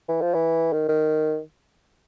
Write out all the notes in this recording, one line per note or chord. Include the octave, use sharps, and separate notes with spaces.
E3
F3
E3
D#3
D#3